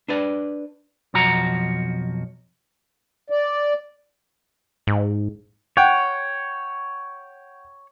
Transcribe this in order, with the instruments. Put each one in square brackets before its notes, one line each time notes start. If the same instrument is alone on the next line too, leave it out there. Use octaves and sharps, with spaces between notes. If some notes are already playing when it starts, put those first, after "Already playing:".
[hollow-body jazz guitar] D4 B4 D5
[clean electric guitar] B1 F2 F3 F#4 A#5
[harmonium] D5
[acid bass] G#2
[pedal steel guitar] C#5 [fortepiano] F#5 G5